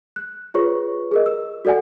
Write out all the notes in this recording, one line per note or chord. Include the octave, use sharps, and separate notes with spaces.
F#6
F4 G#4 B4 C#5 C#6
G#4 A#4 D#5
E6
F#4 A4 D5 F#5 G#5